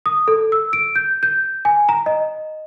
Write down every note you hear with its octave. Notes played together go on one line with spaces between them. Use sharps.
D#6
A4
E6
D7
G6
G6
G#5
A#5
D#5